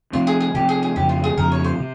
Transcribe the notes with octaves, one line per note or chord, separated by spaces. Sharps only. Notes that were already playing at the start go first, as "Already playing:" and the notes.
C3 F3 C4 F4
G#4
G#4
C3 F3 C4 G4
G#4
G#4
F2 C#3 F3 G4
F4
G#4
F2 C#3 F3 A#4
C#5
C5
C3